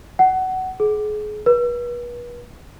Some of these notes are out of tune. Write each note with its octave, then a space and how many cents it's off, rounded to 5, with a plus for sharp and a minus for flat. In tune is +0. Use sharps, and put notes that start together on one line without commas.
F#5 +20
G#4 +30
B4 -35